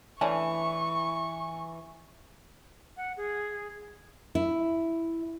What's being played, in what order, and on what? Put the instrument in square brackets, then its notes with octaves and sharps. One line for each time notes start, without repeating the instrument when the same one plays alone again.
[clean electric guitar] E3 [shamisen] A3 C#4 D4 [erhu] C#6
[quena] F#5
G#4
[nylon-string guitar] E4